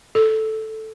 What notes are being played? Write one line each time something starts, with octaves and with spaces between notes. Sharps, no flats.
A4